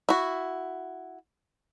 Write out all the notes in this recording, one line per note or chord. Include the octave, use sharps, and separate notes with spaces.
E4 F#4